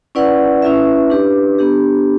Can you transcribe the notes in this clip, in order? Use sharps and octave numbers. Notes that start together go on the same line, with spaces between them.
C#4 E4 B4 D5 F#5
C#4 E4 B4 E5
D4 G4 B4
B3 D4 G4